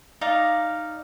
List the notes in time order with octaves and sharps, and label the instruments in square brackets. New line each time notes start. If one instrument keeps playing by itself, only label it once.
[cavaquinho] D#4 D5 F5